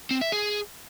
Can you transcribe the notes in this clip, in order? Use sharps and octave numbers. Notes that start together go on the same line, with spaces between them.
C4
E5
G#4